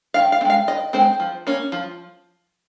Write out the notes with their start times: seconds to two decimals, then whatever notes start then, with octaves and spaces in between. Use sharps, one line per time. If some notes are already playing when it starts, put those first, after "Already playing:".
0.14 D#3 F5
0.32 F5
0.41 C4
0.45 G#3 F5
0.68 D#3 D#5
0.93 G#3 C4 C5
1.20 F3
1.47 A#3 C#4
1.72 F3